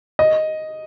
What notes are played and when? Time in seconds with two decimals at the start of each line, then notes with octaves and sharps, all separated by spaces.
0.19 D#5